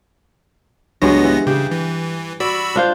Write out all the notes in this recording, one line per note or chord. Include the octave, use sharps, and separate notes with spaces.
C#2 G2 F#3 G#3 B3 A#6
E3
C#3 G4
E3
F#4 D5 B5 E6
D4 F4 C5